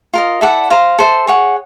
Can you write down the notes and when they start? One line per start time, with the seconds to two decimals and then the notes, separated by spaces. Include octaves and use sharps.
0.13 F4 A#4 D#5
0.41 E4 A4 D5 F#5
0.70 C5 F5 A#5
0.99 A4 C5 E5
1.27 G#4 C#5 F#5